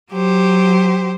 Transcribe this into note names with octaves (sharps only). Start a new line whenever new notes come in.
F#3 G4 C5